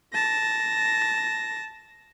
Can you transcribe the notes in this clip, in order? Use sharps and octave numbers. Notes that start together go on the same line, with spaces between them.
A5 A#6